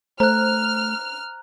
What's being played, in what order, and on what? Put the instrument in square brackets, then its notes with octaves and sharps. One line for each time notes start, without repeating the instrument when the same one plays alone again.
[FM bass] A3 [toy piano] C5 [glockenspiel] A#5 F#6 [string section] F6